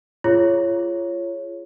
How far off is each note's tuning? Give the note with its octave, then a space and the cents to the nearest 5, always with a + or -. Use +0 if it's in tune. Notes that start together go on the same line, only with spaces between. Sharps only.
F4 -30 G#4 +0 C#5 -5